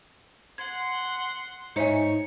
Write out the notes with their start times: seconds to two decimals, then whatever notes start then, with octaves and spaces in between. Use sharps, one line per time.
0.58 F#5 C6 G#6
1.76 G#2 D#4 C5 C#5 E5 G#5 C#7